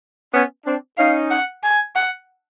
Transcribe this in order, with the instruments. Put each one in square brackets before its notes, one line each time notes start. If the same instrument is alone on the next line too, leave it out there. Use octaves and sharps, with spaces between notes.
[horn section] B3 C#4
C4 D4
[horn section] C#4 D#4 [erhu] F5
[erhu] F#5
G#5
F#5